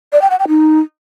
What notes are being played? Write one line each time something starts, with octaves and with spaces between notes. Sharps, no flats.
D5
G5
F#5
G5
D#4